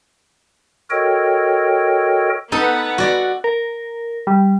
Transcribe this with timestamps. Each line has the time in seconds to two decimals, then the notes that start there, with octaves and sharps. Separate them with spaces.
0.91 F#4 A4 A#4 C#5 D#5 G5
2.52 B3 D#4 A4 B4 F#5
2.98 F#4 D5
3.44 A#4
4.27 G3